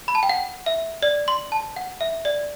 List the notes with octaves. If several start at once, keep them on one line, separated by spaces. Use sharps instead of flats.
B5
A5
G5
F#5
E5
D5
C6
A5
F#5
E5
D5